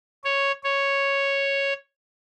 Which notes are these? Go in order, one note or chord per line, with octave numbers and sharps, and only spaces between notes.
C#5
C#5